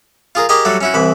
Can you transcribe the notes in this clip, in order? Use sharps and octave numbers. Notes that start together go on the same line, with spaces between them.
F4 G#4 A#4
G4 G#4 A#4 D#5 G5 G#5
F#3 G3 A3 F#4
C#4 E4 F#4
C2 E3 B5